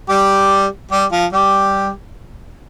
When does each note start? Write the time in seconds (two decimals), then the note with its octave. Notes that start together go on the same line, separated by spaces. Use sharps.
0.09 G3 G4
0.91 G3 G4
1.11 F3 F4
1.32 G3 G4